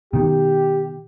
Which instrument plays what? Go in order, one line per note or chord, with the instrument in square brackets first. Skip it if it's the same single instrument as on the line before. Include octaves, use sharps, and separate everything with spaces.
[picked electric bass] B2 D#3 [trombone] G4